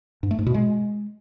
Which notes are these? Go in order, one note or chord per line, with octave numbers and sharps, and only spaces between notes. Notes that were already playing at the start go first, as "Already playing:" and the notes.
G2
A3
G#2
B2
G#3